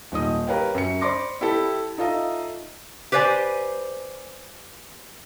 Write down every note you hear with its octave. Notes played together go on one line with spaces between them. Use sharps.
D#1 G#2 D#5 D#6
G4 A#4 B4 C#5 F5 G5
F#2 C#7
C5 D5 B5 C6 D6 A#6
E4 G4 A4 B5
D#4 F4 A4 D#5 E5
G4 B4 C5 D5 G#5